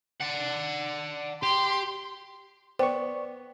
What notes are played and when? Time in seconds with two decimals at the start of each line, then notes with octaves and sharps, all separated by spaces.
0.21 D5 F#5
1.43 G4 C6
2.79 B3 C5 D5 G5 C#6